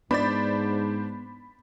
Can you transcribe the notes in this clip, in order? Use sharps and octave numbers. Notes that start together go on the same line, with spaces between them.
G#2 B3 D4 C5 D5 B5 A6